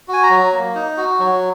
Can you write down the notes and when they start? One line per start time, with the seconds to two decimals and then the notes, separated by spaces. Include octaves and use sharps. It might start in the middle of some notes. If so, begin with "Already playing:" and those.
0.08 F#4 G#5
0.23 A#5
0.30 F#3
0.53 A#3
0.75 D#4
0.97 F#4
1.19 F#3